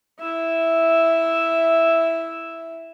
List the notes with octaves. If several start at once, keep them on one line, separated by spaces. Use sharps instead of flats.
E4 E5